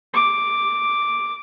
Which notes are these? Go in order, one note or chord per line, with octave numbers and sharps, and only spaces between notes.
D6